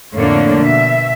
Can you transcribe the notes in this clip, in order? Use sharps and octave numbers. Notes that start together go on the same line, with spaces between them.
F2 A2 D3 A#3 D4 C#5
B2 E5